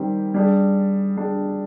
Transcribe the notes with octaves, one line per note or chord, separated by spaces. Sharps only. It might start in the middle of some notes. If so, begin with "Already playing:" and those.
Already playing: D#3 G3 C4 G4
G3 D4 G#4
G3 D4 G#4